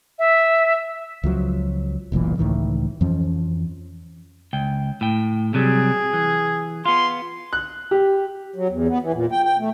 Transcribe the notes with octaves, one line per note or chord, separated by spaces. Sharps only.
E5
C#2 F3 F#3
F1 B1 A#2 E3
C#2 A2 D#3 E3
F2 E3 F3 C#4
C#2 G5
A2 G5
C3 F#3 G3 G#4
E3
B3 F4 C6
F#6
G4
F#3
E2
B3
E3
A#2
G5
G5
A3